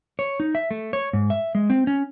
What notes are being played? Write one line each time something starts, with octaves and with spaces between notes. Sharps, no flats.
C#5
D#4
E5
A3
C#5
G#2
E5
G#3
C4
C#4